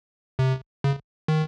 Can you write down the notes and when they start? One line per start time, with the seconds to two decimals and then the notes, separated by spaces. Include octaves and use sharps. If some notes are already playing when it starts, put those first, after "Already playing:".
0.39 C3
0.84 C#3
1.28 D#3